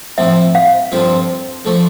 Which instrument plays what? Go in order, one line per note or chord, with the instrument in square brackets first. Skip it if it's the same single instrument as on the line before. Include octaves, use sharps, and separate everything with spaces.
[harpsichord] A2 F3 C4 [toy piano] E5
[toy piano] F5
[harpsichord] G2 D3 F3 C4 F4
D3 F3 A3